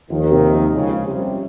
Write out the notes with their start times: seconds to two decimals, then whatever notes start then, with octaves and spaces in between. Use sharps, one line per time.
0.10 D#2 D#3 F3
0.31 C3
0.53 F3
0.74 C#2 C#3 G#4
0.96 C#4
1.07 C2 C3
1.17 G3